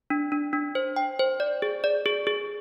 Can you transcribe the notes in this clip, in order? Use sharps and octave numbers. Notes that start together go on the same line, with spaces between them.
D4
D4
D4
C5
G5
C5
D5
G#4
D5
G#4
G#4